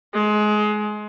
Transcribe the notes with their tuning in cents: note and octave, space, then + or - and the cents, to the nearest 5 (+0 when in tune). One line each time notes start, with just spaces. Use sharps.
G#3 +25